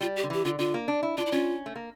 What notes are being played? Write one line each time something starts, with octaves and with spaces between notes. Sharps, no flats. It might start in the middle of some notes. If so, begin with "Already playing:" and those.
G3 F4
G4
D3
E3 G4
D3 F4
D3 F4
A#3
D4
E4
D4 F4
E4
C#4 F4
A3
A#3